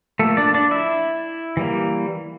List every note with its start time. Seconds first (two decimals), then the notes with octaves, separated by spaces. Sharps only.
0.19 F3 A3 A#3 A4
0.37 D4 D5
0.54 D4 D5
0.71 E4 E5
1.57 E3 G3 A#3